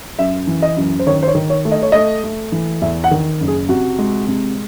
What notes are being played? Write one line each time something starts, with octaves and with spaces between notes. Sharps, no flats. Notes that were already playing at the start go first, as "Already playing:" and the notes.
F#2 E5
E3
D#5
F#2
C5
D#3 C#5
C5
C#5
D#3
C#5
A3
D#5
C#5
A3 D#5
A3
E3
E2 E5
F#5
D#3
F#1
G#4
C3 F#4
G#3
C3